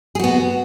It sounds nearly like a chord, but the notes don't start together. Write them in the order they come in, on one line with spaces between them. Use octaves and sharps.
G#4 F#4 B3